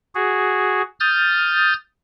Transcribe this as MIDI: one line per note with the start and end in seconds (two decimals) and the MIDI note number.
0.15 0.82 66
0.15 0.82 68
1.00 1.73 87
1.00 1.73 89
1.00 1.73 91
1.00 1.73 93